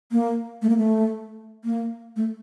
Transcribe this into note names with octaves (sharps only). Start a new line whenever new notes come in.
A#3
A3
A#3
A3
A#3
A3